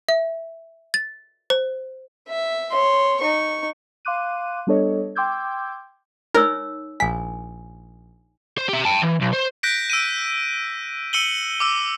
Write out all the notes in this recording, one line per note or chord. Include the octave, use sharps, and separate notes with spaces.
E5
A6
C5
E5
C#5 C6
D#4 C#6
F5 C6 D6 F#6 D#7
G3 B3 D4 A4 C#5 D#5
G5 C6 D6 E6 G6 G#6
D#4 A#4 C#5 E6
A#1 G#5 B6
C5
G4 E5
G5 A5
E3
B1
C5
F#6 G6 A#6 B6 D7
E6 D7 D#7
E6 C#7 D#7 F#7 G7
D6 E6